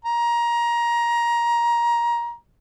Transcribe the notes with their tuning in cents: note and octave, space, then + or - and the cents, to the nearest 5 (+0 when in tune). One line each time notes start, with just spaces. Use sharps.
A#5 +20